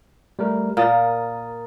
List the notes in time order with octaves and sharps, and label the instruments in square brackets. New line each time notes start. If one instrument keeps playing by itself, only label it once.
[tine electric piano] G3 A3 A#4
[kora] A#2 [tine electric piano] A#4 D#6 A6